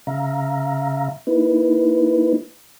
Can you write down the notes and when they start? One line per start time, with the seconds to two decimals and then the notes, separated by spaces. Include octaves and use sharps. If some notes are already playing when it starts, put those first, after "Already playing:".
0.07 C#3 E5 F5 A#5
1.27 A#3 D#4 E4 B4